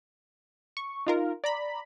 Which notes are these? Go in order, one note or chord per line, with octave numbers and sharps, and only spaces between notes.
C#6
D#4 F4 A#4
D5 A#5 B5